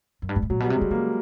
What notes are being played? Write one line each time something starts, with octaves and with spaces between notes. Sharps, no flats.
F#2
G2
G#2
A2
A#2 F#3
B2 G3
C3
C#3 G#3
C#3 A#3